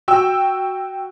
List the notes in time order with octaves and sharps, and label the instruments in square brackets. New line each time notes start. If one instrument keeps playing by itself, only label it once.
[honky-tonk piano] F#4 G5 E6